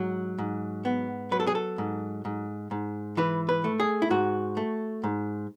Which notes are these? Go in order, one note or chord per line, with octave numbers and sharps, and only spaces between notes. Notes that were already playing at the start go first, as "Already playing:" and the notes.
Already playing: G#2 F#3
G#2
B3
F#3 B4
A4
G#4
A4
G#2
G#2
G#2
E3 B4
B4
A3
G#4
E4
G#2 F#4
A3
G#2